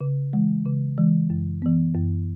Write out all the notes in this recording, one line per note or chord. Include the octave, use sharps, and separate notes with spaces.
C#3
E3 G#3
C#3
E3 G#3
F#2
E3 B3
F#2